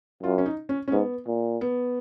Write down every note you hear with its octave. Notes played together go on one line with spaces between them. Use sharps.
F#2 F4
C#4
D#4
C#4
C#4
G#2 B3
A#2
B3